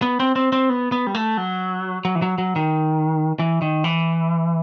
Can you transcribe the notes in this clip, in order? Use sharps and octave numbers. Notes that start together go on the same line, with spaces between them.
B3
C4
C4
C4
B3
B3
G3
A3
F#3
F#3
E3
F#3
F#3
D#3
E3
D#3
E3